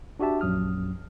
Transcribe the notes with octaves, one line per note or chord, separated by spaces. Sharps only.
D4 F#4 G4 E5 A5
A#1 F#2 F#3 D#6 F6